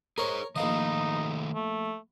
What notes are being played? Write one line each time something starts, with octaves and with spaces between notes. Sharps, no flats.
G#4 A#4 C5 C#5
A#1 D#3 A3 D#4 D#5 F5
A3